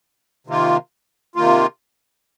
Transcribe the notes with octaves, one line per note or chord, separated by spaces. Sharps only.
C3 D#3 A#3 F4
C3 D#3 A#3 F4